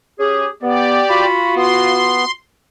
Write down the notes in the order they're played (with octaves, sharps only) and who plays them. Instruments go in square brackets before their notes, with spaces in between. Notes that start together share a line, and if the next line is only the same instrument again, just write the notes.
[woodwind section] C#4 G4 G#4
[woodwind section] B3 [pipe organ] G4 D5
[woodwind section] F4 F#4 [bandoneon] B5
[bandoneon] B3 [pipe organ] C6